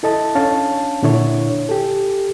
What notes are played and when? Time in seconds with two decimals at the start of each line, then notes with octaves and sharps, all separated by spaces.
0.03 E4 A4 D#5 A5
0.35 C#4 D4 C#5 F5 A5
1.03 A#2 D3 D4 E4 C#5
1.69 G4 A4